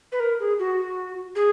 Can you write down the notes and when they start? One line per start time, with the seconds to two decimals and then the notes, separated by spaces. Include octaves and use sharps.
0.12 B4
0.20 A#4
0.40 G#4
0.59 F#4
1.36 G#4